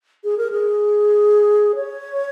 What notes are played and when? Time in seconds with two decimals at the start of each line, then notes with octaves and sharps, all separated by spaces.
0.24 G#4
0.38 A#4
0.51 G#4
1.75 C#5